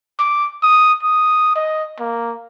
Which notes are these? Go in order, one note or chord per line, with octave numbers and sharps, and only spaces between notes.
D6
D#6
D#6
D#5
A#3